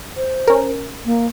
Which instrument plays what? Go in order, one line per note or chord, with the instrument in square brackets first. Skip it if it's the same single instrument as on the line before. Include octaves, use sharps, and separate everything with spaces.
[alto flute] C5
[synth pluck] C#4 A#4
[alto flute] A#3